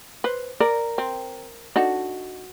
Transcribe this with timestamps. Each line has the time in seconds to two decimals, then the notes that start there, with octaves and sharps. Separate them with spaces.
0.24 B4 C5
0.60 A#4 D5
0.98 C4
1.76 D4 D#4 F#4 A4